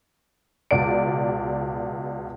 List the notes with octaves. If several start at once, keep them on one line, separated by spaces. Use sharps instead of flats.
C#2 B2 D5 D7